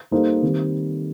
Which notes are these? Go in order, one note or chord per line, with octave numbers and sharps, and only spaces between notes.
G3 A#3 D#4 A4 C5
D#3 G3 C4